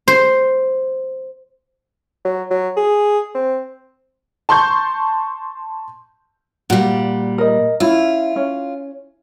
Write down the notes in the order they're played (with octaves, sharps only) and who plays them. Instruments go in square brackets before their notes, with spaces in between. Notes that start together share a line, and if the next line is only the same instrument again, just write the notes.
[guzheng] C5
[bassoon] F#3
F#3
G#4
C4
[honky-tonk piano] A5 C6 C#6 G6
[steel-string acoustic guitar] A#2 G3 [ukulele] F#4
[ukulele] A#4 D#5
[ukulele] C#4 E4 E5 [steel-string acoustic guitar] F4
[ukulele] C#4